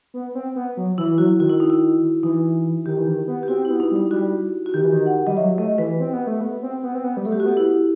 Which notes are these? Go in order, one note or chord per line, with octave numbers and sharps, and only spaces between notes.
B3
C4
B3
F#3
E3 E4
F#3 F#4
D#3 F#4
E4
D#4
E4
E3 D#4
D#3 G4
E3
D#3
B3
G4
C4 F#4
E4
B3
D#4
G3
D#4
G3 F#4
F#4
D#3 G4
E3
D#3
F#5
G3 D#5
F#3 E5
A3 D#5
E3 B4
C4
B3
A3
B3
C4
B3
C4
B3
G3
A3 A4
G4
A3 F#4
B3 G4
E4